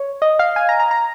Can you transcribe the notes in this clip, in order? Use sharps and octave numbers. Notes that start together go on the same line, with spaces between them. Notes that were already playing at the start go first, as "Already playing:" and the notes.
Already playing: C#5
D#5
F5
G#5
A#5
A#5
A#5